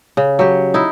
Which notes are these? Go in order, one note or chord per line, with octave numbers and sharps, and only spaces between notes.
C#3
F#3 G4
D#4 E4